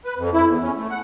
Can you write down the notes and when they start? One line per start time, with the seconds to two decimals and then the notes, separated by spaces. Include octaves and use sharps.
0.05 B4
0.18 F2
0.34 E4
0.48 E2
0.62 C#4
0.77 A3
0.90 F#5